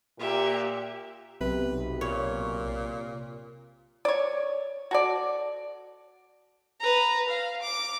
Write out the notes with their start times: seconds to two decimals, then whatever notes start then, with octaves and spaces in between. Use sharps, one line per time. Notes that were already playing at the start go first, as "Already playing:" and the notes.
0.19 A#2 G4 E5
1.41 B1 C3 B4
2.01 A#2 C#5
4.05 C#5 D5
4.91 F#4 A4 D5
6.80 B4 A#5
7.28 F5
7.61 D6